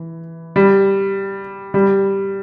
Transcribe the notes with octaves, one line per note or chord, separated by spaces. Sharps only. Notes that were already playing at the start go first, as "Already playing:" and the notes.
Already playing: E3
G3
G3